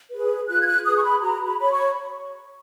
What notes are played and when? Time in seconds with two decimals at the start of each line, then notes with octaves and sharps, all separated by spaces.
0.10 G#4 B4
0.48 F4 F#6
0.62 G#6
0.66 F#6
0.85 G#4 B4 D#6
0.96 C#6
1.03 B5
1.22 F#4 A#5
1.46 B5
1.59 C#5 B5
1.71 C#6